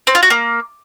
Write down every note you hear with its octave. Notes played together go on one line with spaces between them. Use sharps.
C4
F4
F#4
A#3